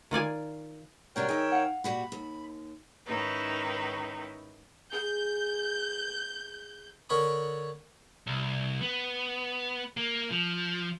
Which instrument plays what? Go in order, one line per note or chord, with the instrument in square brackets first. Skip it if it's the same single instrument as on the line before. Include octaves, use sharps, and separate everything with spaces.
[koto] D#3 F4 D5 G#5
[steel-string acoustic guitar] F#2 C3 D4 [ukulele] F#4 [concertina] A#4 C#5 G5
[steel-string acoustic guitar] D#3 E5 [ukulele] G#4 D#5
[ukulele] F5 F#5
[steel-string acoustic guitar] A#2 G3 F#4 [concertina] B5
[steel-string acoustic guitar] D#2
[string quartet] G#2 D#3 C#4 D#4 E4 B4
[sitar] G#4 [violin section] G6
[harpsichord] D3 A#4 C#5 B5 D#6
[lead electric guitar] C2
B3
A#3
F3